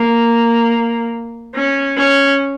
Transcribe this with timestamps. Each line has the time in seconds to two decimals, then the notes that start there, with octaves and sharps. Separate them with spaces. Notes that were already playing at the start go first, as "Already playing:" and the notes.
Already playing: A#3
1.55 C#4
1.97 C#4